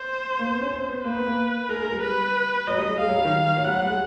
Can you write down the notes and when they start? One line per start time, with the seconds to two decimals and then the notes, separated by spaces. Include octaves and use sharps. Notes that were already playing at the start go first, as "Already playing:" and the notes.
Already playing: C5
0.39 A#3
0.50 B3
0.61 C#4
0.71 C4
0.88 B3
1.04 A#3 B4
1.15 B3
1.27 A#3
1.69 G#3 A#4
1.80 G#3
1.92 G3
2.02 B4
2.67 F#3 D#5
2.78 G3
2.89 G#3
3.00 G#3 F5
3.09 F#3
3.16 G3
3.25 D#3
3.57 F#3
3.65 G3 F#5
3.74 F#3
3.82 G3
3.90 G#3